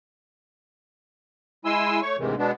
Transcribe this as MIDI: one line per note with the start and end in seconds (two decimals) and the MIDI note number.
1.65 2.00 56
1.65 2.00 64
1.65 2.00 80
1.65 2.00 84
1.65 2.00 88
2.02 2.16 57
2.02 2.16 73
2.02 2.16 85
2.19 2.35 38
2.19 2.35 44
2.19 2.35 48
2.19 2.35 51
2.19 2.35 52
2.19 2.35 56
2.38 2.51 47
2.38 2.51 56
2.38 2.51 59
2.38 2.51 62